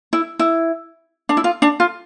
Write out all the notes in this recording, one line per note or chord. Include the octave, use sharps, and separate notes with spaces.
E4
E4
D4
E4
F4
D4
F4